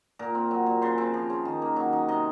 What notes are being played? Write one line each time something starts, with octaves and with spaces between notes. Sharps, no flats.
A#2 A#4
C4
F#3
A#2
C#3 C5
C4
F3
C#3
D#3
A#3
F#3
D#4
C3 D#5